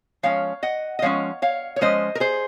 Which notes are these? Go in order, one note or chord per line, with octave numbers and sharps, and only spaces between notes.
F3 G#3 C#4 C#5 F5
D#5 F#5
D#5
F3 G#3 C#4 C#5 F5
C#5 F5
C#5
F3 G#3 C#4 C5 D#5
A#4
G#4 C5